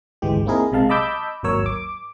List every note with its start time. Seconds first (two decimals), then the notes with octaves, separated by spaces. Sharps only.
0.22 G#1 D2 E3 G#3 G4
0.46 A#3 C4 D#4 E4 G#4 A#4
0.72 B1 C3 G#3 F5 A5
0.89 D#5 A5 B5 D6 E6 G6
1.43 G#1 D#2 F#3 A#4 C#5 E6
1.66 D6